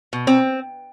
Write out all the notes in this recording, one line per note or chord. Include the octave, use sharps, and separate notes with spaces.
B2
C4